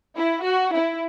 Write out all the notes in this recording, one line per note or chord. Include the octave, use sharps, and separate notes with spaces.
E4
F#4
E4